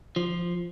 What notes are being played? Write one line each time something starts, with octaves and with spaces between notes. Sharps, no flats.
F3